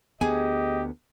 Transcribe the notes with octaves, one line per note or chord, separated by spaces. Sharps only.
D2 B3 G4 G#4 D#5 G#5